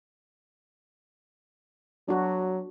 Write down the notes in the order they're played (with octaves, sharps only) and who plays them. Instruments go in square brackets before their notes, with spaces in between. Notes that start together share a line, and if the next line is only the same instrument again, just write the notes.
[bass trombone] F#3 [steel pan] D4 F#4